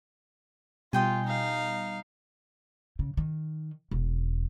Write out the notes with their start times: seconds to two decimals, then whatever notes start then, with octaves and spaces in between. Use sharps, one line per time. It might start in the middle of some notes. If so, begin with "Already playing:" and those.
0.93 B2 G3 F4 D#5 G5 G#5
1.27 D#4 F5
2.99 C#3
3.17 D#3
3.91 E1